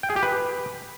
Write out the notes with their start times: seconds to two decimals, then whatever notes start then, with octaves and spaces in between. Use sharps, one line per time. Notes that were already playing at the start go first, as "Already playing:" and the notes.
0.03 G5
0.10 G#4
0.16 G4
0.23 B4